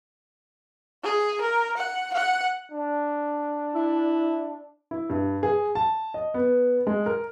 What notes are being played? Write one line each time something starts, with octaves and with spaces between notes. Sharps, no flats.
G#4
A#4
F#5
F#5
D4
E4
E4
G2
G#4
A5
D#5
B3
G#3
A#4